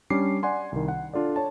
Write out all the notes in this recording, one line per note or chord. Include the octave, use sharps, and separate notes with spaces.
G3 C#4 D4 D6 C7
D5 F#5 G#5 C6
C2 D#3
F#5
D4 F4 A4 D5
C#5 A5